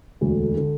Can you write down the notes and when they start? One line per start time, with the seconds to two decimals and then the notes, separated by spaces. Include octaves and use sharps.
0.21 E1 D2 D3
0.57 D3